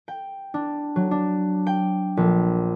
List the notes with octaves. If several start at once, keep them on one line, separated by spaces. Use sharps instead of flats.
G5
D4
F#3
D4
G5
A#1